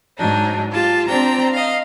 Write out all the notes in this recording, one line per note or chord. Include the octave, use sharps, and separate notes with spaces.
G#2 F#3 D4 D#4
F4 G4 A5
C4 D4 C5 G5 A#5
D#5 F5